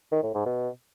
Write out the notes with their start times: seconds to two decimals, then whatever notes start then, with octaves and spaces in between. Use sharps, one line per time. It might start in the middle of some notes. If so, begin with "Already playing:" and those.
0.12 D#3
0.23 A2
0.34 G#2
0.46 B2